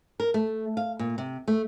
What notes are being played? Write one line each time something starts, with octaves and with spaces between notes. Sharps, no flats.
A#4
A3
F5
A#2
C3
A3